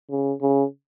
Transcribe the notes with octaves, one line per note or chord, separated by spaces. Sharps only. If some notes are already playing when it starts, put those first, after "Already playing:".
C#3
C#3